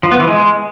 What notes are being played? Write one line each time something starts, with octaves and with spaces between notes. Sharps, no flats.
F3
B3
E3
G#3